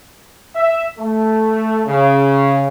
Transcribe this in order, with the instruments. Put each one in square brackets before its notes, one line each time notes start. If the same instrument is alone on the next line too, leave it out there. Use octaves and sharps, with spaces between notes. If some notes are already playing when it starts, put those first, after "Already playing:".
[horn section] E5
A3
C#3